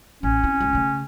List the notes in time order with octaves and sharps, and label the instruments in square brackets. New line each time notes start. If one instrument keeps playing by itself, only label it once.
[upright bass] A1 [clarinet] C#4
[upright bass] C4 E4
C#2 D3
C#3 A3